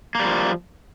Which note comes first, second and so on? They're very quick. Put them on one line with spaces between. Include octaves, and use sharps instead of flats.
A#3 G3 F3